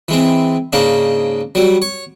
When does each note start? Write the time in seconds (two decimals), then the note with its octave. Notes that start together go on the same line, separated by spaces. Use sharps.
0.08 E3 G#3 C4
0.73 G#2 C#3 A#3 D4 D#4
1.55 F#3 G3
1.82 C#5